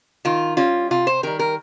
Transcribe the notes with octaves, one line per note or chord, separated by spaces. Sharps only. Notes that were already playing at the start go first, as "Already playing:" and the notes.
D#3 F4
G3 C#4 F4
C3 F4
C5
D#3 G3 A#4
A#4